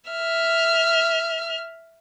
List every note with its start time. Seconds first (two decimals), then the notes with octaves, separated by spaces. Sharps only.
0.10 E5 F6